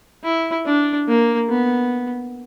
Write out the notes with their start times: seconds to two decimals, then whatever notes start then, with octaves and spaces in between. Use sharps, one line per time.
0.24 E4
0.66 D4
1.07 A#3
1.49 B3